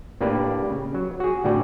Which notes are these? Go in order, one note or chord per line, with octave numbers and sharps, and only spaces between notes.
A2 A#3 D4 G4 B4 D5
C#3
F#3
F#4 G#4
A2 D3 F#4 D5 G5